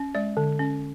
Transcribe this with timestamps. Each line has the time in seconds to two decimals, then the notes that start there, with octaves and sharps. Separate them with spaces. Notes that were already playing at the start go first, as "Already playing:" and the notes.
Already playing: C#4
0.15 G#3 D5
0.37 D3
0.59 C#4